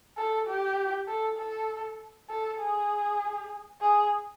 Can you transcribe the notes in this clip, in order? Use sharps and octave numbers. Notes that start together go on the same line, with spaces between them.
A4
G4
A4
A4
A4
G#4
G#4